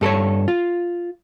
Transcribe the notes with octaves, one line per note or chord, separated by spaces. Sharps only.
G2 A4 A#4 C#5
F4